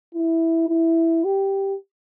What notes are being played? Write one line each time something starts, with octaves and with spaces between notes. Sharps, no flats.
E4
E4
G4